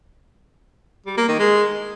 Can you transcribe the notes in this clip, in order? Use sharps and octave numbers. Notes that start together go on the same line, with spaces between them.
G3
A#3
D#3
G#3